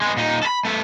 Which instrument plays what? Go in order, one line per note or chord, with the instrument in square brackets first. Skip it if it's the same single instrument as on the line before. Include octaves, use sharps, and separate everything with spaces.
[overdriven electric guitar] G#3 B3
A#2 D#4
A4 B5
A3 B3